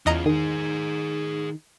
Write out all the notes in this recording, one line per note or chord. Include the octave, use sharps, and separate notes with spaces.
E2 C#4 F4 D#5 A#5
D#3 G#4 C5